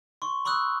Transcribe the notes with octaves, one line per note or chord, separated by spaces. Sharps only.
C6 C#6
B5 C#6 D#6 E6 F#6